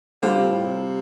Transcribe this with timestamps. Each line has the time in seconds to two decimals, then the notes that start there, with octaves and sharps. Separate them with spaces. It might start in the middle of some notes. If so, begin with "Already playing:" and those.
0.22 D3 G3 F4 C5 F5
0.37 C3
0.50 A2
0.64 C3